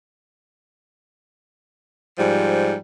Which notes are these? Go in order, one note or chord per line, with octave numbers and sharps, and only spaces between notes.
G#2 F3 G3